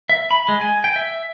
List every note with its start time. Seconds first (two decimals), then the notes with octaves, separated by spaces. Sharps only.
0.09 E5
0.31 B5
0.48 G#3
0.61 G#5
0.84 G5
0.96 E5